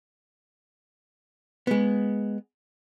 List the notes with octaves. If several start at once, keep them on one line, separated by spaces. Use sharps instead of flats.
G#3 B3